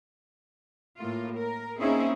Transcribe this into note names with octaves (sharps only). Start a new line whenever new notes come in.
A2 A#3 F4
A#4
A#3 C4 C#4 D#4 E4 G#4